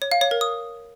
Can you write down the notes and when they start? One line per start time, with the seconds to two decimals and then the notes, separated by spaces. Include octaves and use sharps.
0.02 C#5
0.11 F5
0.21 C#5
0.31 A#4
0.41 D#6